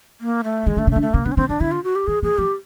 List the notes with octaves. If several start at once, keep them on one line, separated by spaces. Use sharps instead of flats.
A#3
A3
D#3 G#3
D3 A3
C#3
A3
D3
A3
C#3 A#3
D3 B3
C#4
D3 C4
D#3 D4
D3 E4
F4
F#4
G4
D#3 G#4
E3 G#4
F3 G4